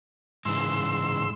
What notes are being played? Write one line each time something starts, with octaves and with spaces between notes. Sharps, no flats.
G#2 C#3 E3 G#3 C6 E6